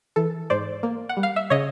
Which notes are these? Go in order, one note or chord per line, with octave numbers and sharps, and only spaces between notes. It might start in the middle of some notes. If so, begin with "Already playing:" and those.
E3 A4
G#2 C5 D5
A#3
F#5
G3
F5
E5
C#3 C#5 D#5